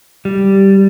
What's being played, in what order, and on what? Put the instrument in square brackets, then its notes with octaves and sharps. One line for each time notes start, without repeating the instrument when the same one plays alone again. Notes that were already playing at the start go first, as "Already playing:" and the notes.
[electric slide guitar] G3